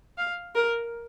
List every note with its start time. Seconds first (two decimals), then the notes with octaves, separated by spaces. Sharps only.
0.18 F5
0.55 A#4